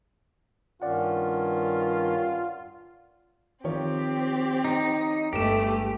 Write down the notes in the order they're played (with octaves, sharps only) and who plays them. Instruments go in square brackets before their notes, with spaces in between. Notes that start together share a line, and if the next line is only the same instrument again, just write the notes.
[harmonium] G2 D#3 C#4 [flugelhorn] F4 [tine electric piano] D5 F#5
[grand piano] D#3 F3 C#5 [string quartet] C4 G4
[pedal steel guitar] D#4
[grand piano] G1 E7 [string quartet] G#3 A3 [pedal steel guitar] G4